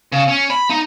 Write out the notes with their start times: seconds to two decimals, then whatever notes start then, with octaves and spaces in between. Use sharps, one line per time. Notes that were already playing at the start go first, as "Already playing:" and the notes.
0.12 C#3
0.28 C#4
0.50 B5
0.70 D#4